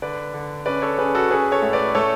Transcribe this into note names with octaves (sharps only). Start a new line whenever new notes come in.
D3 B4 D5
D3
C#4 B4 D5
A4 C#5
C#4 G#4 B4
F#4 A4
C#4 G#4 B4
A4 C#5
A2
B4 D5
A3 A4 C#5